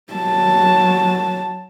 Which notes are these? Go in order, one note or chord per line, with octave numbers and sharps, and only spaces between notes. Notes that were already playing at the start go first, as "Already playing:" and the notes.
F#3 A5